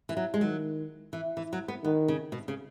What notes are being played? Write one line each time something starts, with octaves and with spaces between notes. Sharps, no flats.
E3
F#3
G#3
D#3 F#3
E3
E3
F#3
B3
D#3 B3
C#3
B2
C#3